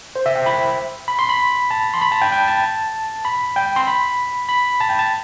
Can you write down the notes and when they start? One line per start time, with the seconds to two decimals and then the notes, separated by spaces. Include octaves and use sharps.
0.16 C5
0.26 E5
0.35 G5
0.46 B5
1.08 B5
1.19 C6
1.29 B5
1.71 A5
1.94 C6
2.02 B5
2.12 A5
2.22 G5
2.32 G5
2.48 A5
3.25 B5
3.56 G5
3.76 C6
3.87 B5
4.49 B5
4.81 A5
4.89 G5
4.99 A5